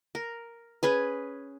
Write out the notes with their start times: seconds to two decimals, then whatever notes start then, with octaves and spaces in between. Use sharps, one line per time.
0.15 A#4
0.83 C#4 G#4 B4